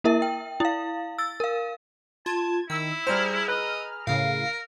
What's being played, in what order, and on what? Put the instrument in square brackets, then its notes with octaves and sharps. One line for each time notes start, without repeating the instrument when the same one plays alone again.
[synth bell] A#3 E4 A#4 E5
G5
E4 F5
E6 A6
A#4 F5
[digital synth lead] F4 [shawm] A5 [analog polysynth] G#6
[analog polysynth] D#3 [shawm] E4 [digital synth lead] E6
[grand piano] G3 C5 [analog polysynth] G#4 A#5 F6
[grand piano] B4 F#6 [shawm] D#5
[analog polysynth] A2 C#3 [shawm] A#4 [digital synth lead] F5